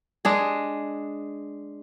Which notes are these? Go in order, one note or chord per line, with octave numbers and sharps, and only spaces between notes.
G#3 D4 G#4